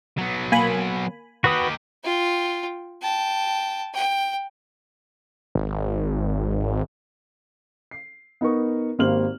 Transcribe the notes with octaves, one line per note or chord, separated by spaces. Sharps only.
F#3 B3
A#3 G#5 B5
D#3 F#4 G4 B4 D#6
F4 G5
G5 A5
G5
G#1
C7
B3 D#4 A#4 C#6
G#1 A#3 G4 C5 F6 F#7